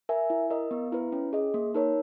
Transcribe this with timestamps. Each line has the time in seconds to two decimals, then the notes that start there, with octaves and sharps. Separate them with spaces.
0.09 A#4 E5 G#5
0.30 E4
0.50 A#4 D#5
0.71 B3
0.92 E4 B4
1.12 C#4
1.33 G#4 D#5
1.54 A#3
1.74 D#4 A#4 C#5